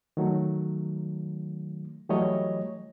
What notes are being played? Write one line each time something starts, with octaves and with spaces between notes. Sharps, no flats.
D#3 F#3 A3
E3 F#3 G3 A3 C#5 D#5